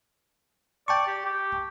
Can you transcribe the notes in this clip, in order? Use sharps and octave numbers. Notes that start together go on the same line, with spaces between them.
D5 G5 A5 C#6
G4
G4